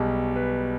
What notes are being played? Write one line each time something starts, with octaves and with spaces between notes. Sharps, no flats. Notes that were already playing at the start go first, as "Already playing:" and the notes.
Already playing: B1 B2 G3 G#4
B4